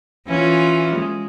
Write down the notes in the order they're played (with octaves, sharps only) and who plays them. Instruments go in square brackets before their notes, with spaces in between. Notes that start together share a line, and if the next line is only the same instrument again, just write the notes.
[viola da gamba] E3 C#4 F4
G#3